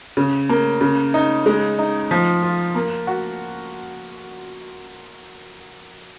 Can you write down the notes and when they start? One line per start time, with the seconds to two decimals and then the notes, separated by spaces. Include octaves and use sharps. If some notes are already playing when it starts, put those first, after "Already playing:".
0.17 C#3
0.49 A#3
0.81 C#3
1.14 D#4
1.46 G#3
1.79 D#4
2.11 F3
2.42 F4
2.75 A#3
3.07 F#4